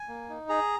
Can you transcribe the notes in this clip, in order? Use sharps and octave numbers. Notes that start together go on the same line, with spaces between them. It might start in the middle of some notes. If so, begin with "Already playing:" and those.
Already playing: G#5
A#3
D#4
G#4 A#5